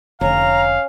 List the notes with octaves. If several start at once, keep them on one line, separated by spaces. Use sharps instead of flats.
F1 D3 C#4 F5 A#5